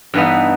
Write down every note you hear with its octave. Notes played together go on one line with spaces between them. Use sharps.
G2 E3 B3 D#4